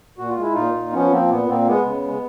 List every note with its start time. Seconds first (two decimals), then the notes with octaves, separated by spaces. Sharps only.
0.18 A#2 F#4
0.30 F4
0.37 G#3 E4
0.54 A#2 D#4 F4
0.74 A#2
0.93 F3 B3 C#4
1.11 F3 A#3 C4
1.30 A#2 B3
1.48 A#2 A#3 C4
1.67 G#3 B3
1.85 C#3
2.05 G#3